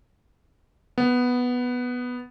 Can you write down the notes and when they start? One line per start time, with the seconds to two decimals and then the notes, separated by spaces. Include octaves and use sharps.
0.98 B3